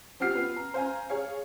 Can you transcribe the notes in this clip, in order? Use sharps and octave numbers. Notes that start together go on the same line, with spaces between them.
F3 C4 F#4 G4 F6 C7
B3 F4 B4
A#5
C5 F5 G#5 A#5
G#4 C#5 F5